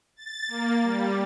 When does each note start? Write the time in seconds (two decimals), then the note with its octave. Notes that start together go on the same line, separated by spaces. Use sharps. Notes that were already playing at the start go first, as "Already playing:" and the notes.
0.16 A6
0.48 A#3
0.84 G3